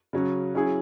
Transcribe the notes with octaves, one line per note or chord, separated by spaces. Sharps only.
C#3 F#3 C#4
F#3 C#4 E4 G#4